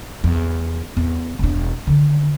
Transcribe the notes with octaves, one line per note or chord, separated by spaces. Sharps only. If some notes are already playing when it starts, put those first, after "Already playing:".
E2
E2
E1 D4
D3 D#3